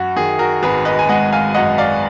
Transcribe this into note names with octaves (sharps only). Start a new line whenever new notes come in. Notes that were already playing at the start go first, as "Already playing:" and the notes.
Already playing: F#2 F#4
D#3 G#4
F#4 A#4
G#1 G#4 B4
B4 D#5
G#5
G#3 D#5 F#5
F5 G#5
F#2 D#5 F#5
D5 F5